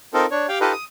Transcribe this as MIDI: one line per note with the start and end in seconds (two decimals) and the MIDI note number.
0.14 0.26 60
0.14 0.26 63
0.14 0.26 65
0.14 0.26 69
0.14 0.26 70
0.31 0.47 62
0.31 0.47 73
0.49 0.59 67
0.49 0.59 77
0.49 0.59 79
0.61 0.73 63
0.61 0.73 65
0.61 0.73 67
0.61 0.73 69
0.61 0.73 71
0.61 0.73 75
0.73 0.84 87